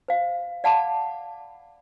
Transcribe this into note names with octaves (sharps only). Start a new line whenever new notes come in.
C5 F5
D5 F5 F#5 A5 B5 D6